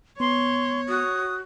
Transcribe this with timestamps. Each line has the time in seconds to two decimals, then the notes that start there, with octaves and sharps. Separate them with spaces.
0.20 B3 C#5 C6
0.88 F#4 D#6